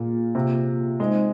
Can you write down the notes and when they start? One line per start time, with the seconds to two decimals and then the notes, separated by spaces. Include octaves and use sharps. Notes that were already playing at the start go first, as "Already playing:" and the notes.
Already playing: A#2 A#3 F4 G#4
0.35 C3
1.00 G#3 C4 D#4 G#4 C5